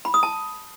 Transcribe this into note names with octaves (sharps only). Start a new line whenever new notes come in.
B5
D#6
A5